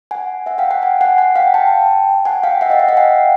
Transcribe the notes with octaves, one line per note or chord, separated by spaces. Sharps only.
F#5 G#5
E5 F#5
F5 G5
F#5 G#5
F#5 G#5
F#5 G#5
F#5 G#5
F5 G5
G5 A5
F#5 G#5
F5 G5
E5 F#5
D#5 F5
E5 F#5
F5 G5
F#5 G#5